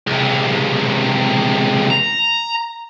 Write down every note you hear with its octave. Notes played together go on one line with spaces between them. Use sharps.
C#2 C3
A#5